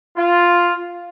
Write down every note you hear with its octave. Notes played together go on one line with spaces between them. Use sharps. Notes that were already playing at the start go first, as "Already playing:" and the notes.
F4